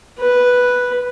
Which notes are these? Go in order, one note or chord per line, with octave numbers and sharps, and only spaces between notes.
B4